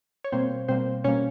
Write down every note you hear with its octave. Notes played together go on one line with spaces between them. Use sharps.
C#5
B2 G3 A#3 C4 C5
B2 G3 A#3 C4 C5
B2 G3 A#3 C#4 C#5